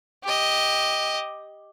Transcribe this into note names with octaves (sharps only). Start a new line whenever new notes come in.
G4 D#5